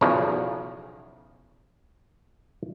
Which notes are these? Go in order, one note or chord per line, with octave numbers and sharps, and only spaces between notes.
B1 E2 C#3 F3